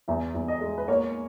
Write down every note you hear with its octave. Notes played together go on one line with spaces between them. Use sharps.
E2 E5
E2
D#5
G#3
B4
A#3 C#5